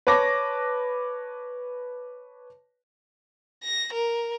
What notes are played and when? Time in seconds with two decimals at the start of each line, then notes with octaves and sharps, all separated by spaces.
0.07 B4 C#5 A5 D6 A#6
3.64 A#6
3.93 A#4